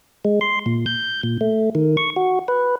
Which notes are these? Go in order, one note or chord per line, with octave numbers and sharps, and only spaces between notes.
G#3
C6
A#2
G6
A#2
A3
D#3
C#6
F#4
B4